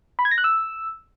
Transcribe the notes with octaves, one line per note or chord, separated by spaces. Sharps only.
B5
G#6
A#6
F#6
E6